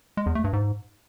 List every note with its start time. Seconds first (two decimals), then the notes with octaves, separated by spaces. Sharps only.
0.17 G#3
0.26 E2
0.35 A3
0.44 G2
0.53 G#2